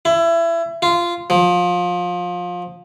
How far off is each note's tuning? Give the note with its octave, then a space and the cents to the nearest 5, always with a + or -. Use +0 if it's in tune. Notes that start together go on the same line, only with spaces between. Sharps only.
E4 +25
F4 -15
F3 +25